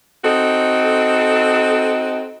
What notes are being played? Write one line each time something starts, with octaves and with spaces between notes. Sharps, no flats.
C4 D#4 F#4 A4